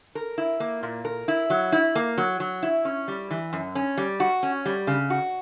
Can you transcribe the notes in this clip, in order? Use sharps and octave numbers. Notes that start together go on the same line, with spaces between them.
A#4
E4
A#3
A#2
A#4
E4
F#3
E4
A#3
F#3
F#3
E4
C#4
G3
E3
F#2
C#4
G3
F#4
C#4
G3
C#3
F#4